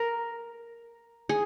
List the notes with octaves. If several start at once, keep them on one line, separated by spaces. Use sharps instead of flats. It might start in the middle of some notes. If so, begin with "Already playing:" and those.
Already playing: A#4
G#4